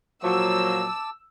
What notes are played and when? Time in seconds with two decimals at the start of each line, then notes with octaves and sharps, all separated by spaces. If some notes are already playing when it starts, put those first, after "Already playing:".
0.24 A#2 F3 F#3 A5 D6 E6